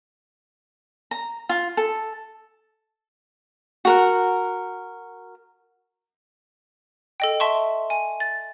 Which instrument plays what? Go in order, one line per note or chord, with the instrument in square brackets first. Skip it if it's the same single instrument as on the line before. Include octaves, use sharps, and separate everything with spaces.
[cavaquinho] A#5
F4
A4
F#4 A#4 F#5
[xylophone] A4 D#5 G5
E5 A5 C6 C#6
G#5
A6